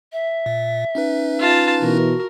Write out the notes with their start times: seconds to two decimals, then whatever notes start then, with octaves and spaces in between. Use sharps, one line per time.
0.13 E5
0.46 A#2
0.95 C#4 D#4 B4
1.40 F4 A5
1.82 B2 E3 F#4 A#4